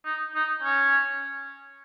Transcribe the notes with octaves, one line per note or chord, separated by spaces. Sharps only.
D#4
D#4
C#4